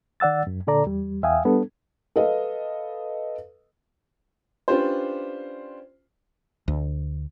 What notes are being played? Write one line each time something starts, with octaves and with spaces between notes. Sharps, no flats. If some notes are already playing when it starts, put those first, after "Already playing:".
D#3 D5 F#5 E6 A6
F#2
A#2 D3 A4 D5 A#5
E2 G3
E2 E5 F5 G5 G#5 D#6
G3 B3 D4 A4
A4 B4 D#5 F5
C#4 D4 F4 G4 B4 C5
D2